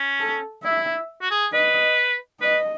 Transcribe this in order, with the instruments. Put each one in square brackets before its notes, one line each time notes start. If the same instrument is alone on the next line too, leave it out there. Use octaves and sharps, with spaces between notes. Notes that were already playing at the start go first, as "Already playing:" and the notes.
Already playing: [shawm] C#4
[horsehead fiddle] A4
[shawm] E4 [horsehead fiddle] E5
[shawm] F#4
G#4
[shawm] B4 [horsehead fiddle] D#5
[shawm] B4 [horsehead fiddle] D#5